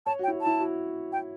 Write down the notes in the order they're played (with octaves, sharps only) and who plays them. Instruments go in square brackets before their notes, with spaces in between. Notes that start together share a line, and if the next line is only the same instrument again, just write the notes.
[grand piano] C#5 [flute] A5
[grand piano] F#4 [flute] G5
[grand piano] E4
F#4
[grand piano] E4 [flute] A5
[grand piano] F#4
[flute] G5